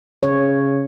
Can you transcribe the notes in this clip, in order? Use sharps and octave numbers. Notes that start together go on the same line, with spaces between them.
C#3 C#5